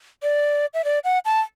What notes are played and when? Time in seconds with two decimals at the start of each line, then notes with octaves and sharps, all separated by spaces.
0.23 D5
0.74 E5
0.84 D5
1.04 F#5
1.25 A5